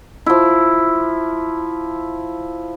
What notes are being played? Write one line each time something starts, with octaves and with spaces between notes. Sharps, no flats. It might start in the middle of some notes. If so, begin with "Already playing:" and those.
F3 E4